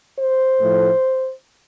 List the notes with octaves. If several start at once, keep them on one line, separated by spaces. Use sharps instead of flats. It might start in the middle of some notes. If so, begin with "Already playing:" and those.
C5
A2 F3 A3